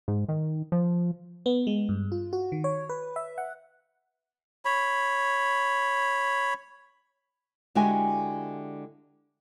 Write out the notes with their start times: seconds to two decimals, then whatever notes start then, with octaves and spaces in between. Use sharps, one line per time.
0.08 G#2
0.29 D#3
0.72 F3
1.46 B3
1.67 G#3
1.89 G2
2.12 F4
2.33 F#4
2.52 D#3
2.64 C#5
2.89 B4
3.16 E5
3.38 F#5
4.65 C#5 B5
7.75 D3 G#3 E4 F#4 G4 G#5